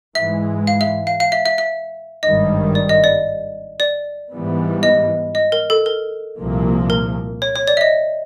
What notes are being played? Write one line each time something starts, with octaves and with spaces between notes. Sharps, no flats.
G#2 E3 G#3 E5
F5
E5
F5
F5
E5
E5
E5
G#1 G2 D#3 G3 D#5
D5
D#5
D5
D5
G#2 E3 G3 B3
D#5
D#5
A#4
A4
A#4
C2 A#2 F3 A#3
A#4
C#5
C#5
D5
E5
D#5